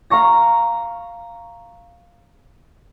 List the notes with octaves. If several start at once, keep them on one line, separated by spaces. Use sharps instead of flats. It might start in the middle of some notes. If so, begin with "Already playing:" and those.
F5 A#5 C#6 A#6